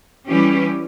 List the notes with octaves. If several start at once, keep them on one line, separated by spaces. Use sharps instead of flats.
E3 G3 C#4 G4